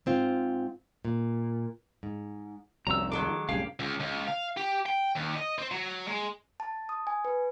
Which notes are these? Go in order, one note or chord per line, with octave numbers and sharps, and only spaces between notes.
G#2 C4 F4
A#2
G#2
C2 F2 C3 G3 C#4 F#4 A#5 E6
D#3 F#3 G#3 A4 D6
C2 F#2 A2 G4 G#4 F5
C#2
C#2
F5
G4
G5
D#2
D#5
C4
F#3
G#3
A5
D#6
G#5
B4